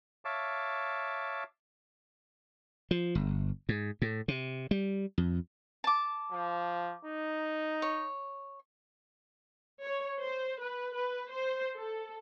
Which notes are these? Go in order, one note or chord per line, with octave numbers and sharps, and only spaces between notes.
C#5 E5 F5 A5 D6
F3
G1
G#2
A2
C3
G3
F2
A5 D6
F3
D#4
C#5
C#5
C5
B4
B4
C5
A4